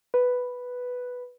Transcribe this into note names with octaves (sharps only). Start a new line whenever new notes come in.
B4